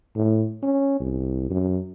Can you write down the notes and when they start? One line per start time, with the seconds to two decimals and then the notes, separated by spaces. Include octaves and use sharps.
0.15 A2
0.63 C#4
1.00 C2
1.50 F#2